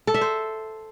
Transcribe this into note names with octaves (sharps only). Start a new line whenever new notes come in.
A4
E5
C5